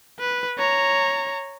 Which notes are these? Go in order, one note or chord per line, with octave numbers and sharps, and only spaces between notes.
B4
C#5 A#5